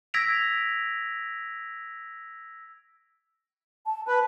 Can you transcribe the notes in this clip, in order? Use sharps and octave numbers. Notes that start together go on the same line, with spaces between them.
E6 G#6 A#6 B6 D7 F7
A5
B4 A5